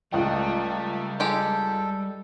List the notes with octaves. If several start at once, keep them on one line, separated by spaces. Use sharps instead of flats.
C#2 G3 A3 G5
G#3 G4 A4